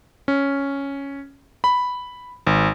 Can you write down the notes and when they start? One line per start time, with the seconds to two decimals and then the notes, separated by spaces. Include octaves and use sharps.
0.28 C#4
1.64 B5
2.47 G#1